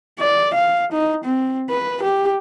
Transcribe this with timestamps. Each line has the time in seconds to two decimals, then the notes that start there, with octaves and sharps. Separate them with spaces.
0.20 D5
0.54 F5
0.92 D#4
1.24 C4
1.70 B4
2.03 G4